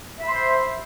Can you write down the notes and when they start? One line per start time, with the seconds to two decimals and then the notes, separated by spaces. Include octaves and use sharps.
0.18 E5
0.23 B5
0.27 C6
0.32 C5